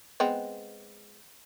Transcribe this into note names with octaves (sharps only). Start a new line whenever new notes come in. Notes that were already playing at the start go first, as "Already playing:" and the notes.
G#3 B3 C4